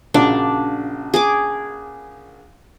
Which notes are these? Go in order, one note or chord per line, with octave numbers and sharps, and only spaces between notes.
A#1 C#3 D4 F#4
G#4 D6